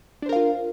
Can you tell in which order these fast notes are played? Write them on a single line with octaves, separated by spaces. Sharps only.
D4 C5 A#4 F5 F4